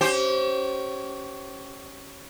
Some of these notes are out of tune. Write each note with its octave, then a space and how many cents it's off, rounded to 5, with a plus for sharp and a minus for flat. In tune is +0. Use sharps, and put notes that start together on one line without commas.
C#4 +0 G4 -35 C5 +0